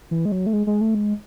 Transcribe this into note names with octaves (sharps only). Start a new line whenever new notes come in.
E3
G#3
F#3
A3
G#3
G#3
A3
G#3